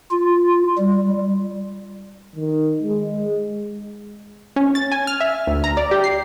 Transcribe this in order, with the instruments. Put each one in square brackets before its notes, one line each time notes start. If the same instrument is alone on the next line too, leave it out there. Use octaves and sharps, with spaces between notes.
[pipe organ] F4
G3
[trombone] D#3
G#3
[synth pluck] C#4
A6
G#5
F6
E5
D2
A#5
D5
G4
C7